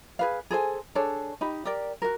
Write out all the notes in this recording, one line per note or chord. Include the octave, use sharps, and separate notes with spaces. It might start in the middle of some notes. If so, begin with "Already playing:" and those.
G#4 B4 F5
G#4 A4 C5 G#5
D4 G#4 A4 C#5
D#4 G4 B5
G4 A#4 D5
F#4 A#4